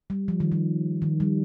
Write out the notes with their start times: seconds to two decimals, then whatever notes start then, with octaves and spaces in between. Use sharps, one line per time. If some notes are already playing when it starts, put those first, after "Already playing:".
0.10 G3
0.28 F3
0.40 D#3
0.52 F3
1.02 D#3
1.20 G3